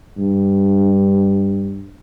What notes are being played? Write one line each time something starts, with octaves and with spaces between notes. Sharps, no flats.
G2